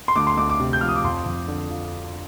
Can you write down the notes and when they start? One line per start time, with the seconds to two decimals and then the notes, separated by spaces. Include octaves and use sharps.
0.08 C6
0.16 D2 D6
0.27 C6
0.37 D2 D6
0.49 D6
0.60 C3
0.73 G6
0.81 F3 F6
0.89 D#6
0.96 D6
1.04 F2 C6
1.26 F2
1.48 D3
1.70 F3